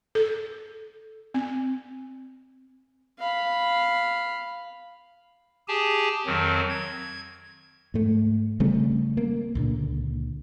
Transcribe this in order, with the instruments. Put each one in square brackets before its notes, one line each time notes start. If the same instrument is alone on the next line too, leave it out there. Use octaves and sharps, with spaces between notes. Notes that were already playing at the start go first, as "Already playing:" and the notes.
[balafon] A4
C4
[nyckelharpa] F5 B5
[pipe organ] G4 G#4 G#5 A5
F2 D#3 F#3 C4
G#6
[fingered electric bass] G#2 A3
C#3 G3 A3 C4
A#3
C#2 A#2 D3